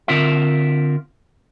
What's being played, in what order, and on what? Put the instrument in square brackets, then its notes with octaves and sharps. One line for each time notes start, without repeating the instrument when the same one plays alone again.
[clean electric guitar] D3 C4 F4 A#4 E5